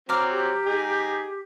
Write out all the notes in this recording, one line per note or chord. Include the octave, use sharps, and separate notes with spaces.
F#3 C4 A#5 D6 F6
G4
D#4 G#4